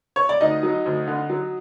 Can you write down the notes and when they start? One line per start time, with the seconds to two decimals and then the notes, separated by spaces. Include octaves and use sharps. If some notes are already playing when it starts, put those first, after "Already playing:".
0.16 C#5
0.29 D5
0.40 D2 D#4 D#5
0.63 F#3
0.86 D2
1.07 D3
1.30 F#3